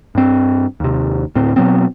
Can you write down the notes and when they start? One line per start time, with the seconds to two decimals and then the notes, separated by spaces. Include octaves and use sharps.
0.15 G2 C4
0.80 D#2 C3
1.35 D2 A2 C4
1.56 B2 F#3 B3 C4